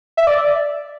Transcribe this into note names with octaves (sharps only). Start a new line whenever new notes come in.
E5
D5